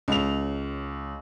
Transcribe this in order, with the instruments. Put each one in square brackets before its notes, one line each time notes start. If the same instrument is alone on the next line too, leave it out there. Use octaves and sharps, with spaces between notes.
[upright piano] C#2 F7